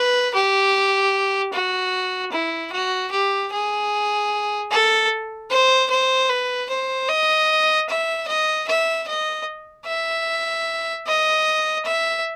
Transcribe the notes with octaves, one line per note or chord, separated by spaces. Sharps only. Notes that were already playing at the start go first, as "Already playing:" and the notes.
Already playing: B4
G4
F#4
E4
F#4
G4
G#4
A4
C5
C5
B4
C5
D#5
E5
D#5
E5
D#5
E5
D#5
E5